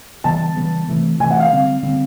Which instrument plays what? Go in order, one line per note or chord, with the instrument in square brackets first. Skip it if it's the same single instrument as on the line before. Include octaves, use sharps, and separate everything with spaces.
[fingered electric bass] C#3 E3 G3 B3 [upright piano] A5
[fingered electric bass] C#3 E3 G3 B3
C3 E3 A3
[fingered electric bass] C3 E3 A3 [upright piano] G#5
[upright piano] F#5
F5
[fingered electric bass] D3 G3 C4
D3 G3 C4